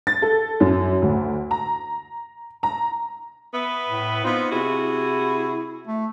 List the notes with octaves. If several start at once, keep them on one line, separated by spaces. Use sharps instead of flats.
A6
A4
F#2
D2
A#5
A#5
B3 B4 E5
A2
B3 C4 D#4 F4
C3 E4 F#4 G#4
A3